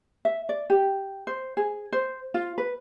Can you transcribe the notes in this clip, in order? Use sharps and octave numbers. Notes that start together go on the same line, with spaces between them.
E5
D5
G4
C5
G#4
C5
F4
B4